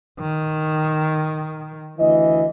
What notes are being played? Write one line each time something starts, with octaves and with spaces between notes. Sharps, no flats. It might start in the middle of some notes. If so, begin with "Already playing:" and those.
D#3
D2 E3 D#5